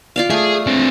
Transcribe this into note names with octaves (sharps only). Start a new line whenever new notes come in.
F4 D5 F5
A3 G#4
C4 D4